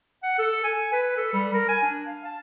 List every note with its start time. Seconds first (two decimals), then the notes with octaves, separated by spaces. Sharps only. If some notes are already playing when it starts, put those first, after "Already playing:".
0.23 F#5
0.39 A4
0.64 G#5
0.92 B4
1.17 A4
1.33 G3
1.53 A#4
1.69 G#5
1.83 D4
2.06 F5
2.24 A5